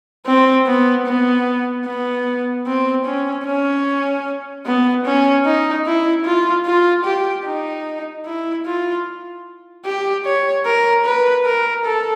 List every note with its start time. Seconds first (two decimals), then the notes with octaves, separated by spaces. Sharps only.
0.26 C4
0.67 B3
1.06 B3
1.86 B3
2.67 C4
3.06 C#4
3.46 C#4
4.66 B3
5.05 C#4
5.46 D#4
5.86 E4
6.25 F4
6.66 F4
7.05 G4
7.45 D#4
8.26 E4
8.66 F4
9.85 G4
10.25 C#5
10.66 A#4
11.05 B4
11.46 A#4
11.85 A4